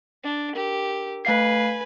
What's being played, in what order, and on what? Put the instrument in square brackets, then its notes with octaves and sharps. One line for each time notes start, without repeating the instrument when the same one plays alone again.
[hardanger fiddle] D4
[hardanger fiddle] G4 [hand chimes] A#4
[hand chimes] A3 F5 C7 [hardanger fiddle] B4 G#5